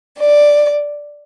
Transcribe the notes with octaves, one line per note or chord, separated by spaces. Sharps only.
D5